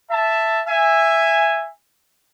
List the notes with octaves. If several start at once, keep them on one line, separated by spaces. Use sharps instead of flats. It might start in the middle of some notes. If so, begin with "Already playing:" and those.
E5 A5
E5 G#5